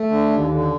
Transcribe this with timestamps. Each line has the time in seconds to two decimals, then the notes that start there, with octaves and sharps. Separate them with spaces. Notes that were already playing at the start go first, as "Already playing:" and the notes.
Already playing: A3
0.09 D3
0.30 D#2
0.51 D3